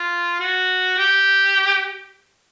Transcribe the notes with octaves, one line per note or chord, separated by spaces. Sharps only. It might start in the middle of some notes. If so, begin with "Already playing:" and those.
Already playing: F4
F#4
G4